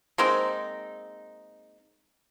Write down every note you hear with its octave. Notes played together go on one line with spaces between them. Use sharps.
G#3 A#3 C4 D#4